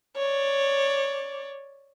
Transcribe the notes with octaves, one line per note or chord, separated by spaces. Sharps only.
C#5 D5